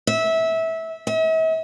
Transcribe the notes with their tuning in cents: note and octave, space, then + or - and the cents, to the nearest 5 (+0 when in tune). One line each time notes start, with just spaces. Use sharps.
E5 -20
E5 -45